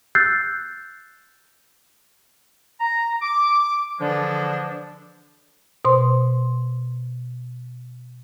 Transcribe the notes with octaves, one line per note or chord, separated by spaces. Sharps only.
E6 F#6 G6 A6 C7
A#5
D6
D3 E3 F3 G#3 D4
B2 C5 C6